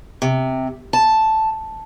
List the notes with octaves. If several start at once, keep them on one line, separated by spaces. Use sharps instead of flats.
C3
A5